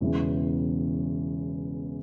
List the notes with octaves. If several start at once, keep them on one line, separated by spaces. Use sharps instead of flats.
E1 E2 C#3 E3